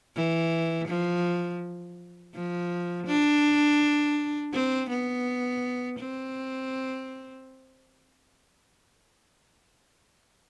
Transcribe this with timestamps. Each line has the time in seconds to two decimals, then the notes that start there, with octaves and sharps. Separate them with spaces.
0.16 E3
0.88 F3
2.34 F3
3.07 D4
4.53 C4
4.90 B3
5.99 C4